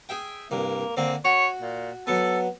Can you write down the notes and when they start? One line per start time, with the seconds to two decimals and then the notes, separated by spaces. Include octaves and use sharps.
0.09 G#4 E5 G5
0.51 C2 G2 A#3
0.97 D3 A#3 C4
1.25 F#4 C#5
1.60 A#2
2.07 F#3 B3 A4